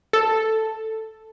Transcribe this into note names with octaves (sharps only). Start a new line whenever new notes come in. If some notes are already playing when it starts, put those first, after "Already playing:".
A4